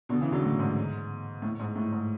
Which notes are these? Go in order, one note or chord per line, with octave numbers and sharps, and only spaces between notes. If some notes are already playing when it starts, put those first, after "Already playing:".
B2 D3
C#3 E3
D3 F#3
A2
G#2
A2
G#2
A2
G#2